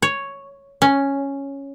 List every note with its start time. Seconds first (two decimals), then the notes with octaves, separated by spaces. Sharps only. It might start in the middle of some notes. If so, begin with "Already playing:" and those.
0.02 C#5
0.82 C#4